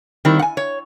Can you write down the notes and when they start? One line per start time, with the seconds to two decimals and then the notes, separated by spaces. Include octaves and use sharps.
0.25 D#3 G3 C4 E4
0.39 F#5 G#5
0.57 C#5